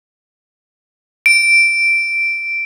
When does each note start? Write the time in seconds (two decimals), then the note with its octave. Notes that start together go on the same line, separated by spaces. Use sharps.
1.26 D7